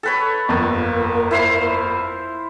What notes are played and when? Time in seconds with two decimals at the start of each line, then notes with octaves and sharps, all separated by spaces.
0.03 A4 B4 C#5
0.49 G1 F2 A#3 A#5
1.31 E4 C5 F5